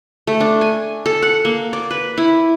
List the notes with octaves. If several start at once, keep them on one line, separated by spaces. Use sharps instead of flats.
A3
D4
G#5
A4
F#5
A#3
D5
B4
E4